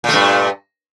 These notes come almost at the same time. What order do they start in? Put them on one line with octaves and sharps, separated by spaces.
A#2 A3 G2